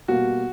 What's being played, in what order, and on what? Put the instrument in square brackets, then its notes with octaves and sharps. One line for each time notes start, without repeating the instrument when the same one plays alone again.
[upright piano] B2 G3 A#3 F#4